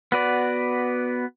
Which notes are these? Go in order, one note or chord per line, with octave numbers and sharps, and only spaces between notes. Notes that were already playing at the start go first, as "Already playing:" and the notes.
B3 F#4 B4 D5